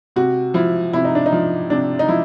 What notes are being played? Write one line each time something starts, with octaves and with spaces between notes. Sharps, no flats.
C3 F#4
F3 E4
C3 E4
D#4
D4
D#4
F3
C3 D4
D#4
F3 E4